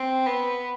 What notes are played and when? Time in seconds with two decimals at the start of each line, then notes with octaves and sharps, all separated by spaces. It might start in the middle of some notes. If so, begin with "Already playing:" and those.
Already playing: C4
0.26 B3